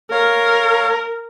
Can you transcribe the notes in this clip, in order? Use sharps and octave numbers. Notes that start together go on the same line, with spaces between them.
A#4 C#5 F5